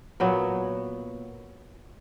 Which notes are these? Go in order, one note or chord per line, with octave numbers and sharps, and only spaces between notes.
A#2 F#3 B3